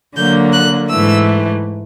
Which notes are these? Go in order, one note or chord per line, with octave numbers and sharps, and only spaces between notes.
D3 F#3 A#3 G6
F#6
G#2 E3 A3 E6